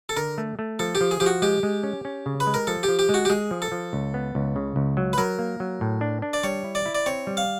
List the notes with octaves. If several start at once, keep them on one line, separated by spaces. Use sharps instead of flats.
A4
D3 A#4
A3
A3
F3 A4
G4
F3
G#4
F3 G4
F#4
G#3 G4
G#3
C#4
C#4
C#3
B4
G#3
A#4
F3 A4
G4
F3
G4
G#3
F#4
G4
G#3 G#4
F3
A4
F3
C#2
B3
C#2
C#3
C#2
F#3
B4
F#3 A#4
A#3
F#3
A2
D4
D4
D5
G3 C#5
E4
D5
E4
D5
C4 C#5
G3
F5